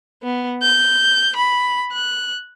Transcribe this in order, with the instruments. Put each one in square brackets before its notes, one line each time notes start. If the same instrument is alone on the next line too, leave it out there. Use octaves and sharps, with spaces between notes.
[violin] B3
G6
B5
F#6